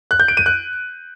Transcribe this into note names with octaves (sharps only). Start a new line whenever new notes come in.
F#6
G6
D7
D#7
F#6